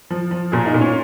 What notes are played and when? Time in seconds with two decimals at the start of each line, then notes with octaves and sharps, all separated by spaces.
0.10 F3
0.31 F3
0.52 A#2 G#4
0.66 D#4
0.74 A#2
0.81 C#4